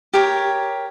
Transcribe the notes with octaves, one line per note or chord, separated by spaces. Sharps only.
G4 A#4 C#5